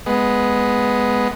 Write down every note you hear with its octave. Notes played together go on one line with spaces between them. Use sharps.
G#3 B3